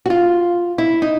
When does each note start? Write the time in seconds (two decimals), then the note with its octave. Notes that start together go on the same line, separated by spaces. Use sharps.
0.06 F#4
0.10 F4
0.78 E4
1.02 D#4